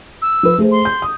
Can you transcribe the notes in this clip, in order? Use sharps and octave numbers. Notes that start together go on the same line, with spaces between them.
E6
F3 B4
A3 G#4 C5
C6
G6
D#6